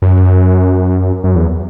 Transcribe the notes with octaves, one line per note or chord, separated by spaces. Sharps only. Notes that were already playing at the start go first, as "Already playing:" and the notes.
F#2
F#2
E2